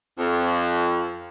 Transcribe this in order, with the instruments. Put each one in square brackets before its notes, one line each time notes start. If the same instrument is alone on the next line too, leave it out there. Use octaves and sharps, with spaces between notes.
[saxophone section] F2